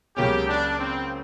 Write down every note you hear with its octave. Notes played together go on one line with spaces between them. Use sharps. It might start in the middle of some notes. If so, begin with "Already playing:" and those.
C#2 C#3 F#3 A#3 C#4 G4
D4
C4